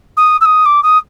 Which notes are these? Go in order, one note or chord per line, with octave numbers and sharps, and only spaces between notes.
D#6
E6
D#6
D6
D#6